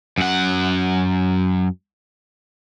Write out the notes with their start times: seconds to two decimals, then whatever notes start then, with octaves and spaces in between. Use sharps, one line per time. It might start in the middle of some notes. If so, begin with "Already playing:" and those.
0.18 F#2 F#5